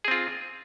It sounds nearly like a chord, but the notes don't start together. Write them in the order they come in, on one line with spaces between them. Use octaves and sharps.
G#4 C4 F4